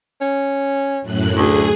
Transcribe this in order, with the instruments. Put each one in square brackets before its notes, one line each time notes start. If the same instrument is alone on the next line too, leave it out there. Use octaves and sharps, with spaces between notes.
[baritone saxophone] C#4
[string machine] F#2 A2 F#6
[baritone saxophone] D2 [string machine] G#4